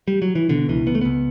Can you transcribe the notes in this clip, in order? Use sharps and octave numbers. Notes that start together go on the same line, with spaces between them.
G3
F#3
E3
B2 D3
C#2 E3
C#2 B3
A3
C#2 B3